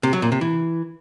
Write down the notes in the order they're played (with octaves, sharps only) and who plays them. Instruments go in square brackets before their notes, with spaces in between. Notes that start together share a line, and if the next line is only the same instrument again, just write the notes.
[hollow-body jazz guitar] C3
F#3
A#2
C3
E3